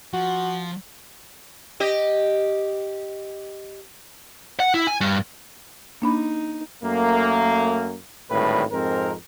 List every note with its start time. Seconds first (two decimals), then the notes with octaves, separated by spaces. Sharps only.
0.14 F3 F#4
1.80 G4 D#5
4.60 F#5
4.74 E4
4.87 G#5
5.01 G2
6.02 A#3 D4 D#4 B5
6.84 F#2 A3 A#3
8.31 G#1 A2 D3 G3 B4
8.72 F2 G#2 C4 A#4